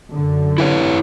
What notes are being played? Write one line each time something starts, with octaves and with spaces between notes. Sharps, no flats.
F#2 D3
E4 B4 C#5